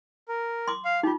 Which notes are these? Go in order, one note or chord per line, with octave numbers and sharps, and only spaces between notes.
A#4
C6 D6
F5
D#4 F4 G4